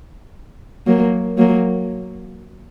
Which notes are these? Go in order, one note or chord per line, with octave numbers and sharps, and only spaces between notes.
F#3 A#3
F#3 A#3